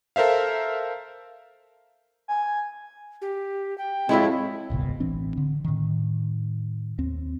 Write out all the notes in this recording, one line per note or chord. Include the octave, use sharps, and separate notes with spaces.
A4 A#4 C5 E5 F5
G#5
G4
G5
F2 A2 G#3 C4 E4
D#1 G#1 C#2 B2
A1 E3 C4 D4
D3
A2 D#3
D#2 C4